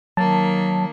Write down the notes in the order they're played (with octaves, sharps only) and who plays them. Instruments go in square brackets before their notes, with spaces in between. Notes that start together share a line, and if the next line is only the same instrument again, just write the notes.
[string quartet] D#3 A#3 [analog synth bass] F#3 [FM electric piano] A5